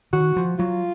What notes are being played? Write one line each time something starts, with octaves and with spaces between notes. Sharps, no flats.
D#3 F#4
F3
F#3 F4